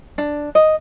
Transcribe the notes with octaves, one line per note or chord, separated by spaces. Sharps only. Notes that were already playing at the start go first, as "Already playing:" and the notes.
D4
D#5